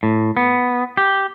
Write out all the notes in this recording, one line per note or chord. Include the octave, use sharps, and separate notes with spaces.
A2
B3
G4